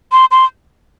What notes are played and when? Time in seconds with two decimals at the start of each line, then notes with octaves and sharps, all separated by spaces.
0.12 C6
0.31 C6